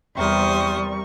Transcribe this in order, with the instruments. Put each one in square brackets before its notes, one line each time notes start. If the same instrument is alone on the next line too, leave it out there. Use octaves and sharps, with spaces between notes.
[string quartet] E2 C5 D#6 [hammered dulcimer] C3 A#4 [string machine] G3 [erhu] C#6